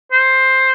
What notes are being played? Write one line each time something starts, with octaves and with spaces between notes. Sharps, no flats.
C5